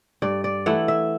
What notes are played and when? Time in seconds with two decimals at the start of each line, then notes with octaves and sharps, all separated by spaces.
0.22 G2 D5
0.44 D5
0.66 E3 A3 E4 F#5
0.88 E5